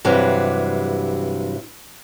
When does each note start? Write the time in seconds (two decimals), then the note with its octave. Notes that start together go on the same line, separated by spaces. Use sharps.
0.05 G2 C3 E3 F#3